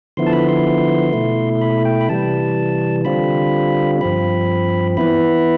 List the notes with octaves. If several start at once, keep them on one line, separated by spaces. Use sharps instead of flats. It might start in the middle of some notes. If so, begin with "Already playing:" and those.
D3 F3 B3 E4 C6
A5
B5
C6
B2 A3 E4
B5
G5
B5
C3 E3 G3 A5
D3 G3 C4 F4 B5
G2 F3 C4 B5
E3 B3 E4 B5